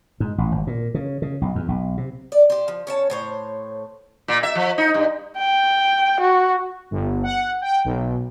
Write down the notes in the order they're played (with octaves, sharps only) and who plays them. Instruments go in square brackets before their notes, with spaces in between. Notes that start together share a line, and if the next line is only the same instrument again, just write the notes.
[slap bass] G#2
A1
G#1
A#2
C#3
C#3
B1
E2
B1
C3
[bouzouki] D5
G4 C5
F3
C#4 C#5 A5
A2 C5 C#5
[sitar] A#2
E5
F3
D#4
G2
[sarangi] G5
F#4
[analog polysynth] G1
F#5
G5
B1